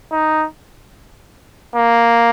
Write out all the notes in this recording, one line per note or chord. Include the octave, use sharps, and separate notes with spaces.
D#4
A#3